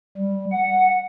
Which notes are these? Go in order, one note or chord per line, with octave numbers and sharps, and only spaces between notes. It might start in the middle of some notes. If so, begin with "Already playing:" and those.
G3
F#5